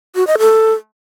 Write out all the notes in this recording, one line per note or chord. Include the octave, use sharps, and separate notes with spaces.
F#4
D#5
A4